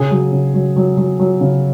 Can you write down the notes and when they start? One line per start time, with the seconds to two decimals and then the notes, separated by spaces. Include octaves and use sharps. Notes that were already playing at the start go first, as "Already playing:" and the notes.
Already playing: C#3 G#4
0.11 F#3
0.32 C#3
0.54 F#3
0.76 F#3
0.97 F#3
1.19 F#3
1.41 C#3